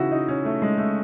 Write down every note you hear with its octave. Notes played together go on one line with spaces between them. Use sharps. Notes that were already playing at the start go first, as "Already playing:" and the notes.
Already playing: C#3 E3 D#4 E4 F#4
D#4
C#4
A3
G#3
A3